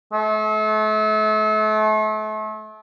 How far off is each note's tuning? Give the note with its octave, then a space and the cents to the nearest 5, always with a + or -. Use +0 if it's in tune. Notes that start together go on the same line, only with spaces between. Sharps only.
A3 -35